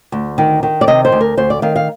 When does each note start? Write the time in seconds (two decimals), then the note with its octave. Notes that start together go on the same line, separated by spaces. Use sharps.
0.12 D2
0.38 D#3
0.63 D#3
0.81 D5
0.87 C3 D#5
1.05 C5
1.12 D2
1.21 A#4
1.37 D2 C5
1.50 D5
1.62 D#3 F5
1.76 F5